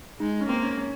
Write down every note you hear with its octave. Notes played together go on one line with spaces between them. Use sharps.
G#3 D#4
C#4
A#3 C4
C#4
C#4